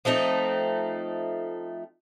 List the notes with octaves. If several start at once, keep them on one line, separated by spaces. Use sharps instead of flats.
F3 A3 C4 D#4